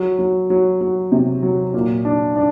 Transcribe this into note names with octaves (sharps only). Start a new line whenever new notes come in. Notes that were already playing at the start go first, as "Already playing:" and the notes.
Already playing: F#3
F#3
F#3
F#3
C3
F#3
A#2
D4
D4